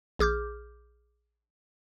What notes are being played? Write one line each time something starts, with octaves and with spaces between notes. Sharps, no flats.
A#1 G#4 D6 F6 G6